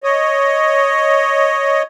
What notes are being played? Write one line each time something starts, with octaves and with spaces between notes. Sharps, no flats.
C#5 D#5